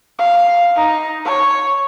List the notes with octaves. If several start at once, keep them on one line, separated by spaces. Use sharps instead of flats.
F5
D#4
C#5